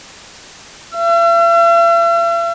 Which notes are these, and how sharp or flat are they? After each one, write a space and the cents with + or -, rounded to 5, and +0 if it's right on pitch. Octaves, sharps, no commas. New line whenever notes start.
E5 +45